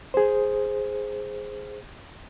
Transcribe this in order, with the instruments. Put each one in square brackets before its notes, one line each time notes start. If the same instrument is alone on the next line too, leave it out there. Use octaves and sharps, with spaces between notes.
[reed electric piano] G#4 C5